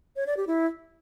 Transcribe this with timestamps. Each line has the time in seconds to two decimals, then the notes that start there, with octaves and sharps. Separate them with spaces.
0.16 C#5
0.26 D5
0.37 G4
0.47 E4